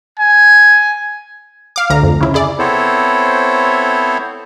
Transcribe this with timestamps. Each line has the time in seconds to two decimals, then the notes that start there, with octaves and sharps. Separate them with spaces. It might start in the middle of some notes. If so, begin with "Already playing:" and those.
0.20 G#5
1.76 F5 D6
1.90 D2 A#5
2.03 F2
2.21 C#3 E4
2.34 E4 G#4 D5
2.59 B3 C4 E4 A4 C5 C#5